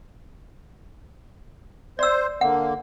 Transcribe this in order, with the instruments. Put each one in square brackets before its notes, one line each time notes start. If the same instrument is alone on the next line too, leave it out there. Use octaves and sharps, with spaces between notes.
[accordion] C5 [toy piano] D5 E6
[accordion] D3 A#3 [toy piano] F#5